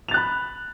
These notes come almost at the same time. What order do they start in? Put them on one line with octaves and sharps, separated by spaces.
F7 A6 F#6 B5